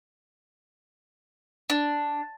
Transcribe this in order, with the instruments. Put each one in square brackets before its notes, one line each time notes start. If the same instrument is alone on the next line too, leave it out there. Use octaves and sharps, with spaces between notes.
[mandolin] D4